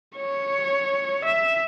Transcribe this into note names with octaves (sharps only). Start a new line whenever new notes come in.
C#5
E5